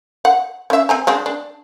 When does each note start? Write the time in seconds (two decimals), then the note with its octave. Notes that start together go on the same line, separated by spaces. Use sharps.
0.25 F#5
0.70 C#4 E5
0.89 C4 G#5 A#5
1.07 G#3 C4 D4
1.26 D4